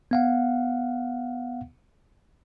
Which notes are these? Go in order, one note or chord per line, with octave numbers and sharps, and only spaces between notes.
B3 F5 F#5